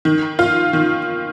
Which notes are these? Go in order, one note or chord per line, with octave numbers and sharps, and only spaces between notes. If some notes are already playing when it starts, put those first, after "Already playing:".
D#3
F4
D#3